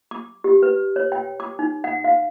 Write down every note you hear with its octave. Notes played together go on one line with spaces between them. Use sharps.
D6
G4
B4
C#5
G5
D6
D#4
F#5
F5